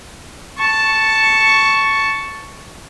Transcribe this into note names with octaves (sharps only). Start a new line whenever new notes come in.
A5 C#6